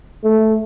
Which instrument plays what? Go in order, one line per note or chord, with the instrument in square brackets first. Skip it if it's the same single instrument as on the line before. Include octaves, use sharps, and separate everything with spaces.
[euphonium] A3